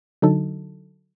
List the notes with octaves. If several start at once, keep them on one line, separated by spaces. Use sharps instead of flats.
D3 F#3 D#4 A4